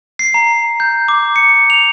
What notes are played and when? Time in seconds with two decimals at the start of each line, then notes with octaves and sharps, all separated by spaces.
0.19 C7
0.34 A#5
0.80 G6
1.08 D6
1.36 C#7
1.70 F7